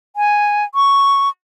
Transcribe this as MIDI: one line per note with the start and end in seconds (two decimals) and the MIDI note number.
0.16 0.64 80
0.75 1.29 85